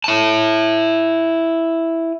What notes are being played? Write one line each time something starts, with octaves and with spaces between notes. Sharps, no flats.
E4 A5